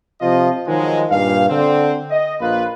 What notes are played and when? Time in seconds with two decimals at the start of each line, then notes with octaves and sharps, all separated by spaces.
0.21 C3 F3 F4 D#5
0.67 D#3 F3 F#3 G#3
1.11 G2 A#2 F5
1.49 D3 C4
2.10 D#5
2.40 A#1 A#3 F4 B4